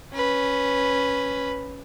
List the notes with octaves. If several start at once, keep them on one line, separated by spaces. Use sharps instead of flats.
C#4 B4